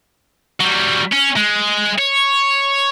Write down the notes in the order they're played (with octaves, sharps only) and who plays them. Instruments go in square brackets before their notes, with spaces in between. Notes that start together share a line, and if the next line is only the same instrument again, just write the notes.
[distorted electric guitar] F#3 G3
C#4
G#3
C#5